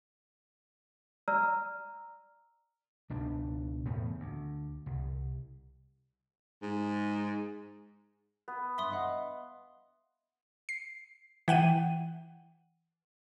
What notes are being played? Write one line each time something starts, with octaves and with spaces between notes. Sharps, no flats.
D5 A#5 E6 F6
C#2 B2 D4
E2 A2 C#3 B3
D2
C2
G#2
B3
G2 E5 C6 D#6
D#5 F5 F#5
C7
E3 F#5 G5 D#7